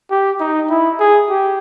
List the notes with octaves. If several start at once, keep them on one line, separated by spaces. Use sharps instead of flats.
G4
D#4
E4
G#4
G4